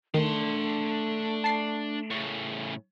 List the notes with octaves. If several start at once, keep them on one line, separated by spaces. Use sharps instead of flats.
D#3 A3 D4 C6
A5 C7
A2 C#3 C#6